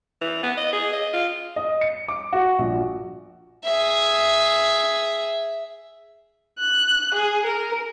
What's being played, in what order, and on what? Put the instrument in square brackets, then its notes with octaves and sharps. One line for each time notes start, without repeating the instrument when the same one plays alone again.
[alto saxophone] E3
B3
D#5
G#4
D#5
F4
[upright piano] D#5
C#7
D6
F#4
A#1
[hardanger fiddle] G#4 E5
[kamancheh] F#6
G#4
A#4